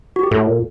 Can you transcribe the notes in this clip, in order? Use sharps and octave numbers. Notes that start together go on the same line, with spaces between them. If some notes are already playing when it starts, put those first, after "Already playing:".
F#4
G4
A2 A4
A#2